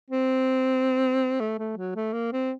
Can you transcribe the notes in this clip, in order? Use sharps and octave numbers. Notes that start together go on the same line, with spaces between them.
C4
A3
A3
F#3
A3
A#3
C4